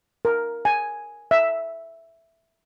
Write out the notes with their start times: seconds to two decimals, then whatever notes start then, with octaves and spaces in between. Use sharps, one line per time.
0.25 A#4
0.65 G#5
1.31 E5